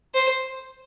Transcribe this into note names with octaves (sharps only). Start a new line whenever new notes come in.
C5